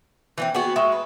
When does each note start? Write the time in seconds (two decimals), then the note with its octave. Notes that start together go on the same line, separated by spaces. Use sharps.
0.38 E3 A3 C4
0.54 B3 F#4 G#4
0.76 G#3 E5 C#6
0.92 B4